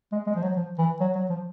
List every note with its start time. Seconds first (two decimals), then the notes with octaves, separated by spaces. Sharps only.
0.12 G#3
0.27 G#3
0.35 F3
0.42 F#3
0.56 F3
0.78 E3
1.01 F#3
1.15 F#3
1.30 F3